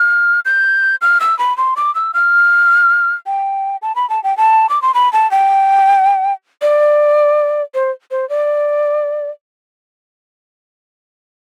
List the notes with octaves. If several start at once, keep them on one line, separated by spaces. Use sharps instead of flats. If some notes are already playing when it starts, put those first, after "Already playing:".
Already playing: F6
G6
F6
E6
B5
C6
D6
E6
F6
G5
A5
B5
A5
G5
A5
D6
C6
B5
A5
G5
D5
C5
C5
D5